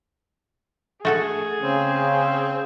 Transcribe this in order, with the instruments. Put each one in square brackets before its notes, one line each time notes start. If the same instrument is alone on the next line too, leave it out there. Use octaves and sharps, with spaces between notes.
[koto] A3 F#4 A4 [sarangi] G#4
[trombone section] C#3 [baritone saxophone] C4